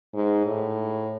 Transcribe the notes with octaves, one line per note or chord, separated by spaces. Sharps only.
G#2
A2